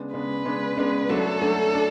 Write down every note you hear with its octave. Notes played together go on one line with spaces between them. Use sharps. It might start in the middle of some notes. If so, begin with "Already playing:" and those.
Already playing: C#3 G#3 B3 D4
C#3 G#3 B3 D4 B4
C#3 G#3 B3 D4
C#3 G#3 B3 D4
F#3 A3 D4 A4
F#3 A3 D4
D4